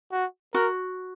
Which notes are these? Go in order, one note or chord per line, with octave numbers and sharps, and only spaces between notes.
F#4
F#4 A#4